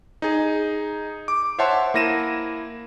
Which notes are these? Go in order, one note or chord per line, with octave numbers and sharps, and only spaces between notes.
D#4 G#4
D6
C5 C#5 E5 F#5 A5 C6
A#3 E4 A#6 D#7 E7